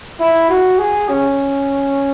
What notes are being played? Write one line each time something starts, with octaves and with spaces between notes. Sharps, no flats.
E4
F#4
G#4
C#4